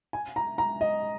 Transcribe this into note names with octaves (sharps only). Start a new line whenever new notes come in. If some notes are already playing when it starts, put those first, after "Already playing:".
G#5
A#5
A#5
D#5